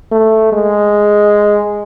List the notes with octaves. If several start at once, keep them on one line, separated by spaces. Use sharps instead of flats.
A3
G#3